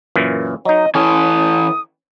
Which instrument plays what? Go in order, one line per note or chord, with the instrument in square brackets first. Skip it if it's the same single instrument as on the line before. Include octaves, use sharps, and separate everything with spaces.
[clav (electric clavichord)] F#2 A#2 E3
[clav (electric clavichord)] F#3 D#4 [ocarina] D#5
[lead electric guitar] E3 A4 [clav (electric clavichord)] C#4 [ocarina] D#6